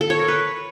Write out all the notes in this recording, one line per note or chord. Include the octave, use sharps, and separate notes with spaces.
A4
C#5
A#4
B4